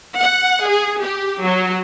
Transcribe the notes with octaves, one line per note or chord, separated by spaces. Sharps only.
F#5
G#4
G4
F#3